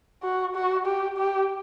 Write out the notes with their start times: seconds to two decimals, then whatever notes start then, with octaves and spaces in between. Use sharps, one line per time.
0.23 F#4
0.55 F#4
0.86 G4
1.17 G4